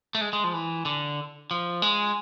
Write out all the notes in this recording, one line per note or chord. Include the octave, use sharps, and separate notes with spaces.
A3
G#3
G#3
F3
E3
D3
F3
G#3